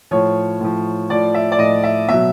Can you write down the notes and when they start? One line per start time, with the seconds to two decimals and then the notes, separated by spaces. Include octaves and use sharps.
0.11 A2 F3 C#5
0.61 A2 F3
1.10 A2 F3 D5
1.34 E5
1.52 D5
1.58 A2 F3 D#5
1.84 E5
2.08 B2 F#3 E5